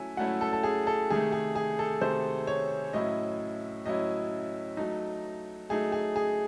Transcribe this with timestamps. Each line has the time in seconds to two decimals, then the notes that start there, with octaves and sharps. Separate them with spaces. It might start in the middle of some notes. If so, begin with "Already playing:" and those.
Already playing: F#3 A3 C#4 E4 G#5
0.17 F#3 A3 C#4 E4 F#5
0.41 A4
0.53 A4
0.63 G#4
0.87 A4
1.10 C3 D#3 A3 G#4
1.32 G#4
1.55 G#4
1.79 A4
2.01 C3 D#3 A3 C5
2.47 C#5
2.93 A2 F#3 C#4 E4 D#5
3.86 A2 F#3 C#4 E4 D#5
4.77 F#3 A3 D#4
5.69 F#3 A3 D#4 G#4
5.92 G#4
6.16 G#4